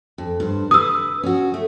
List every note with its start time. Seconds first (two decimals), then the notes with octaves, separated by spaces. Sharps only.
0.18 F2
0.40 G2 C5
0.71 B4 D#6 E6
1.23 C#4 F#4
1.54 A3